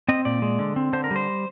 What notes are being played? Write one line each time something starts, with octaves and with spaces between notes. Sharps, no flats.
C4 D#5
A#2 D5
G#3
D3
C4
D3 C5
A#4
G3
C5